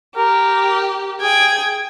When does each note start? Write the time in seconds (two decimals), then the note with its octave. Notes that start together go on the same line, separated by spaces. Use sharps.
0.16 G4 A#4
1.22 G#4 G5 G#6